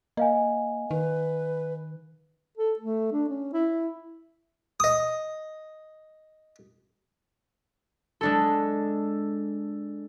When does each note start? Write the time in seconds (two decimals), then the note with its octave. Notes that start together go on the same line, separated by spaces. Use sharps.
0.17 A#3 D#5 F5 G#5
0.91 D#3 B4
2.57 A4
2.79 A3
3.13 D4
3.29 C#4
3.53 E4
4.80 D#5 D#6
8.21 G#3 D4 A4